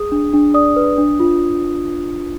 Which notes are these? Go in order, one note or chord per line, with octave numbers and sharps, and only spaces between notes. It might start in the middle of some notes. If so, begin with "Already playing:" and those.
Already playing: G#4 D#6
D4
D4
D5 D#6
B4
D4
F4